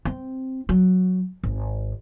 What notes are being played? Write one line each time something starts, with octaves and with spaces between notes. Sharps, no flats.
C4
F#3
G#1